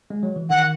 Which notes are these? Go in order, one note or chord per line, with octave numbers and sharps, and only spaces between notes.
G#3
F#3
E3
D#3 F#5